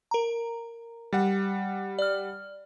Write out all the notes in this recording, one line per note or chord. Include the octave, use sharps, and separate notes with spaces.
A#4 A#5
G3 F#5
D5 F6